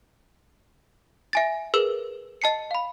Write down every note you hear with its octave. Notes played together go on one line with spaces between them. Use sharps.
E5 G#5 A6
G#4 A#4 B4 E6
D#5 A5 C7 C#7
F5 B5